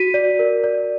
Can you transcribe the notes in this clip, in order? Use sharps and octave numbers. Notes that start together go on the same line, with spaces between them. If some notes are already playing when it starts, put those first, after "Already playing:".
Already playing: F#4 B6 D#7
D5
A#4
D5